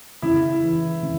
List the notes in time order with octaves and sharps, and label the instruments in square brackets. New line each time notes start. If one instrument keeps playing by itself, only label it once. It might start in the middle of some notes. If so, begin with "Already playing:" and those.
[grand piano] C#3 [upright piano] E4
[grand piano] E3
C#3